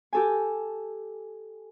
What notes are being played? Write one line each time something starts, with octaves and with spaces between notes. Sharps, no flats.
G4 A4 G#5